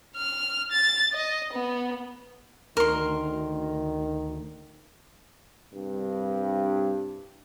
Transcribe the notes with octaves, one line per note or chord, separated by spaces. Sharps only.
F6
A6
D#5
B3
D2 D#3 A#4 C6
C2 G2